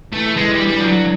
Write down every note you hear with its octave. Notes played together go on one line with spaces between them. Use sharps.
E3 A3
E3 G#3
G3
D3
G3
F3
F#3